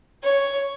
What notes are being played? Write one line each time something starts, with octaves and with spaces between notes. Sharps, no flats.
C#5